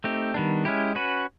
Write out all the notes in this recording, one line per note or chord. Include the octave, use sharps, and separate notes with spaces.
A3 C4 D#4 G4
D#3 G3 B3 D4
G#3 C#4 E4 G4
C#4 F#4 B4